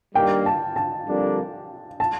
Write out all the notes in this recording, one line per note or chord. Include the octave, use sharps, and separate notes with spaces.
G2 D#3 G3 A#3 G5
A5
A5
F2 D3 G3 A#3 D4
A5